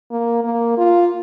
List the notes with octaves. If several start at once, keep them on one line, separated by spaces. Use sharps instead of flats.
A#3
A#3
F4